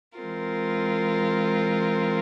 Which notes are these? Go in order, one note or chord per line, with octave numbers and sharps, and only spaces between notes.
E3 G#3 C4 F4 A#4